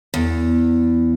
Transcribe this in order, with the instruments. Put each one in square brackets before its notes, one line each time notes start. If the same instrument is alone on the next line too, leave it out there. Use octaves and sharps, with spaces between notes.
[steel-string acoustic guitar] E2